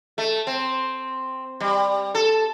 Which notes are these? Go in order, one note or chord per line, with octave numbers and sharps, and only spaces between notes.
A3
C4
G3
A4